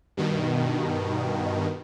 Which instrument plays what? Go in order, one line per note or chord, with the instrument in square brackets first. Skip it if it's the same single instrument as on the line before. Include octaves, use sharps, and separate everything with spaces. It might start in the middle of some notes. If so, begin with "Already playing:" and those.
[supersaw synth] G2 B2 D#3